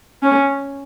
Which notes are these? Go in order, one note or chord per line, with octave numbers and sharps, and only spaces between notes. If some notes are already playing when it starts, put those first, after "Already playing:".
C#4